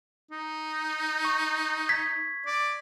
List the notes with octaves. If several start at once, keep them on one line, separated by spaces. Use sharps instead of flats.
D#4
C#6
G#6 B6
D5